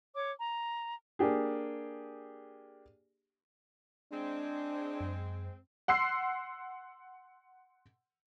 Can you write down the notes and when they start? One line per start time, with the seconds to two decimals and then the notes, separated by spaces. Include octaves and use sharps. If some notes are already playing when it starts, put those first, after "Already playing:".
0.13 C#5 D6
0.39 A#5
1.19 A#3 D4 G4 G#4
4.12 G#3 C4 D4
5.00 F#2
5.88 F#5 C6 E6 C7